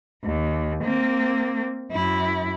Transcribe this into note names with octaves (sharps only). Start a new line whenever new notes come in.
D#2
A#3 C4
F#2 E4